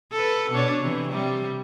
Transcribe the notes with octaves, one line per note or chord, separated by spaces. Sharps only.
A4 B4
B2 D4 C#5
C3 E3
C3 G3